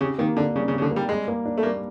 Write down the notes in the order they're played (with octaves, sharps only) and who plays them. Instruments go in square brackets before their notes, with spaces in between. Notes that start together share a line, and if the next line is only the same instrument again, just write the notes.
[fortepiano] C#3 [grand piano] G4
[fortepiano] D#3 [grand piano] A#3
[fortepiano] D3 [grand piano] D4
[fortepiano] C#3 [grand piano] G3
[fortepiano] C#3
[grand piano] G4
[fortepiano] C#3
D3
[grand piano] A#3
[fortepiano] G3
[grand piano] G3 [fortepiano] G#3
[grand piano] A#3
D4
[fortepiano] A3
[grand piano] G3 [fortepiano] A#3